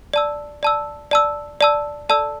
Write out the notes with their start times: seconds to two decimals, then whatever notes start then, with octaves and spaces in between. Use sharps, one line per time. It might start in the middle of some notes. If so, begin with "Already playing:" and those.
0.13 D5 A5 E6
0.63 D5 A5 E6
1.11 D5 A5 E6
1.61 D5 A5 E6
2.09 A4 D5 A5 E6